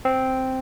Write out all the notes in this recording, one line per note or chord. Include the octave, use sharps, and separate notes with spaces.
C4